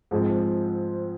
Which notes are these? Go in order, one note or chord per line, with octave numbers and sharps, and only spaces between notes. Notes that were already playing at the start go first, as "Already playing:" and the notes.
G#2 F3 G#3 C4